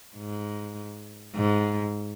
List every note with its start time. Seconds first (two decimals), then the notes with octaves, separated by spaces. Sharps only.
0.16 G#2
1.36 G#2